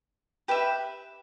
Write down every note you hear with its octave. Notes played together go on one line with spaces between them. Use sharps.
G4 B4 E5